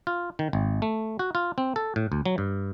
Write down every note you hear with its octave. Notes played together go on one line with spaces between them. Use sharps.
F4
D#3
G#1
A3
F#4
F4
C4
A4
A2
D2
F#3
G2